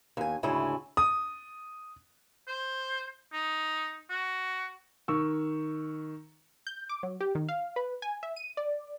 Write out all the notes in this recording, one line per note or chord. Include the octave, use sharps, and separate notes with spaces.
D#2 G#5
D2 G#2 C#3 E4 G#5
D#6
C5
D#4
F#4
D#3 C#6 E6
G6
D6
F#3
G4
D#3
F5
B4
G#5
E5
D#7
D5